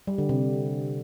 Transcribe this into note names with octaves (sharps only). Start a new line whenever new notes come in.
G3
D3
C3